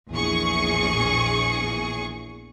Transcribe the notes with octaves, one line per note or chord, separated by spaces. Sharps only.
A#1 E2 G#4 C#6